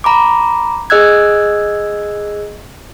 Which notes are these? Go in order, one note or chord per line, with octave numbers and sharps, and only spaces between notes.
A#5 B5 D6
G#4 D#5 E6 F#6 G#6